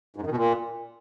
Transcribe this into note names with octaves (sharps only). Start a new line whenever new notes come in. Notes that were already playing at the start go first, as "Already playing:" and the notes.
G#2
F#2
D#3
B2
A#2